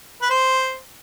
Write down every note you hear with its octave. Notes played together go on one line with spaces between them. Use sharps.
B4
C5